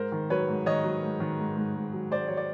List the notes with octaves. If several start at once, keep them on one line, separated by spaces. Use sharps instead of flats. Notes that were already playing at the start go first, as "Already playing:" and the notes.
Already playing: G#2 A#4 C5
D#3
F#3 B4 C#5
G#2
D#3 C#5 D#5
F#3
G#2
D#3
G#2
G#2
G#2
F#3
G#2 C5 D5
F#3 C#5
D5